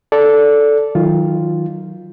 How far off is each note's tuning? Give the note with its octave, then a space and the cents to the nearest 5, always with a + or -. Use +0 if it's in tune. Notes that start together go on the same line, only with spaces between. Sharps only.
A4 +0 D5 -15
D#3 +30 F#3 +0 F4 +0